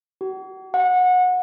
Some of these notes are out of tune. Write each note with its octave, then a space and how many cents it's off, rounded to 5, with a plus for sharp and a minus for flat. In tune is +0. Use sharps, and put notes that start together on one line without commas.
F#4 +40
F#5 -25